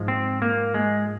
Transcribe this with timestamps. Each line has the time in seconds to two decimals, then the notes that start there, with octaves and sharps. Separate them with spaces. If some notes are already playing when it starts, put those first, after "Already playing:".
Already playing: G#2 F3 G#3
0.08 C4
0.42 A#3
0.74 G#3